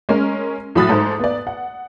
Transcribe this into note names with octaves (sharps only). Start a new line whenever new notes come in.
G#3 C#4 A#4
A2 F#3 B5 D#6 F#6 A6
G#2 A4 C5
B3 D5
F#5